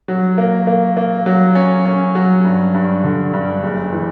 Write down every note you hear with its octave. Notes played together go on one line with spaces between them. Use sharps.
F#3
A#3
A#3
A#3
F#3
C#4
C#4
F#3
G2
G2
D3
G2
F#1
E3